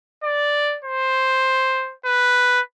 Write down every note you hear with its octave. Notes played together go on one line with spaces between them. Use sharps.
D5
C5
B4